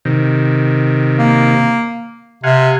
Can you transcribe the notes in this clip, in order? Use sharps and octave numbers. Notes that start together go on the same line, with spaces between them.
C3 D#3
A#3
C3 F5 F#5 G#5